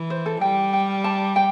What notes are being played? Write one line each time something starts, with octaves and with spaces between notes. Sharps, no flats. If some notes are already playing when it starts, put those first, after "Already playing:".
Already playing: E3
C5
A4
G3 G5
G5
A5
G5